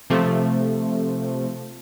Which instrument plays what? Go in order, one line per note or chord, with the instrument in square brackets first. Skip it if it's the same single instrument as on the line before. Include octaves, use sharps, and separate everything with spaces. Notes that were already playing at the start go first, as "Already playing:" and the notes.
[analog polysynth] C3 F3 A3